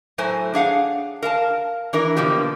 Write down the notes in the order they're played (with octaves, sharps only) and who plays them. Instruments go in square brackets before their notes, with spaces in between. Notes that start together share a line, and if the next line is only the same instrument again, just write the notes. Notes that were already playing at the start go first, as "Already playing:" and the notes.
[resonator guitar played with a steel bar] A2 F#3 A3 C5 G#5
D4 G#4 F5 F#5
A#4 F5 A5
E3 D4 E4 A#4
B2 D3 F3 A#3 G4